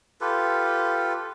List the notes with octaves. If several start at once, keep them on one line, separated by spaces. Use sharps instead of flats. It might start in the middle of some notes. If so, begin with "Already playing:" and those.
F4 G4 A4 B4